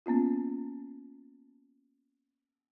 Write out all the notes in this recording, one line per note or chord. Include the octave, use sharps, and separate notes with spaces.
A#3 B3 C#4 F4